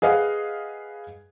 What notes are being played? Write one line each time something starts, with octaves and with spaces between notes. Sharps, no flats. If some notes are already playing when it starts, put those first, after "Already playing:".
G#4 B4 D#5 F5 F#5